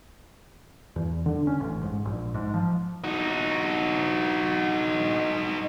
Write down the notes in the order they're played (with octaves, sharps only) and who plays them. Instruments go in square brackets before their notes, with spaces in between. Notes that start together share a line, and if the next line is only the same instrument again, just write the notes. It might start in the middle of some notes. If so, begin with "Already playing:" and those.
[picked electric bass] E2
D3
C#4
A1
G#2
A#1
G#2
F3
[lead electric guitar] D#4 F#4